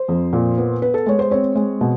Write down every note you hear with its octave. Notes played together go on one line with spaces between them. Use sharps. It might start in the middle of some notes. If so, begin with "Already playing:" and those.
Already playing: C5
F2
A#2
B3
B3 B4
A4
G#3 C#5
C5
C4 C#5
G#3
B2